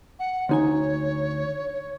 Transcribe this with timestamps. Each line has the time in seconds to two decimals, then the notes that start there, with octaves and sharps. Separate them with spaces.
0.19 F#5
0.49 D2 D#4 C#5 G#5